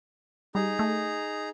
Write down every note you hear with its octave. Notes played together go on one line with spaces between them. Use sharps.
G3 D#4 G#4 A#5
A3